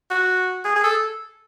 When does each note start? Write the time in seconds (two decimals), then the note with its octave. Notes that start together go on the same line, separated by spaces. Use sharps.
0.11 F#4
0.65 G#4
0.76 G#4
0.83 A4